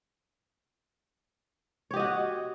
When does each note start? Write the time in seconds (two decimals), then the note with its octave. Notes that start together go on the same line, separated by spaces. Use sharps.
1.91 C#5
1.94 G4
1.97 D#5
2.00 F#4